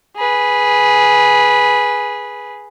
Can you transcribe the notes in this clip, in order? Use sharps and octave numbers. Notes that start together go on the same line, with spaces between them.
G#4 B4